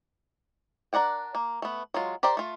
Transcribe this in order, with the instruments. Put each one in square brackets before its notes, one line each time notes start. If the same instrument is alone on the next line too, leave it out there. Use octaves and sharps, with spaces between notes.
[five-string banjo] D4 A#4 D5 F#5 G5
A#3
A3 B3
F#3 G#3 F4
G4 A#4 C5 D5 G5
A3 F4